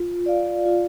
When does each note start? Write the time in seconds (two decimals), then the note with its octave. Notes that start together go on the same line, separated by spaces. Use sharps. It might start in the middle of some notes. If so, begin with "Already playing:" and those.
Already playing: F4
0.26 D5 F5
0.65 F4